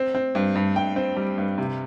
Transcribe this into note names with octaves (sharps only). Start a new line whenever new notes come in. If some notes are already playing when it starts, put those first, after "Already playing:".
Already playing: C4
C4
G2
G2
G2 G5
C4
G3
G2
C3